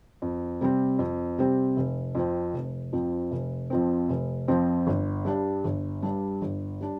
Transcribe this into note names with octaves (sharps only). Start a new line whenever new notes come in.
F2
C3 G3 C4
F2
C3 G3 C4
F1
F2 F3 C4
F1
F2 F3 C4
F1
F2 F3 C4
F1
F2 F3 C4
G1
G2 G3 D4
G1
G2 G3 D4
G1
G3 D4